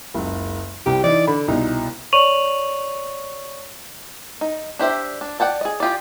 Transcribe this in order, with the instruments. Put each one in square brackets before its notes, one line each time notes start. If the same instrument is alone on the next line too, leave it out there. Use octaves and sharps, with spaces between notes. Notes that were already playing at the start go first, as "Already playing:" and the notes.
[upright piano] F#1 C#2
[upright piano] C2 C3 [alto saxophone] G4
[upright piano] E3 D#4 [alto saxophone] D5
[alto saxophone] D3 [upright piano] B5
[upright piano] C2 B2 [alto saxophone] D#4
[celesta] C#5 D5 C#6 D#7 F7 F#7
[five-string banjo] D#4
D4 G4 C5 E5
D4
D5 F#5 G5 A5
G#4 D#5
F4 G4 G#4 D5